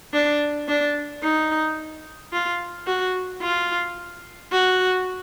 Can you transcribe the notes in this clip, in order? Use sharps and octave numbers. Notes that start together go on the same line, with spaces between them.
D4
D4
D#4
F4
F#4
F4
F#4